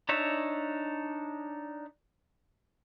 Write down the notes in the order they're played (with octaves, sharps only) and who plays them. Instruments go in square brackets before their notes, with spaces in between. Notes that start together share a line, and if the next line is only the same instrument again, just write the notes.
[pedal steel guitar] D4 D#4 C#5 E5